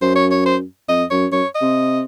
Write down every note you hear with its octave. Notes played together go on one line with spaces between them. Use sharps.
F#2 C5
C#5
C#5
C5
F2 D#5
F#2 C#5
F#2 C#5
D#5
C3